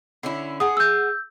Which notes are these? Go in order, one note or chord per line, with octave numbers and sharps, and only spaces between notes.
D3 C#4 E4
G#4 F#5 D#6
E6 G6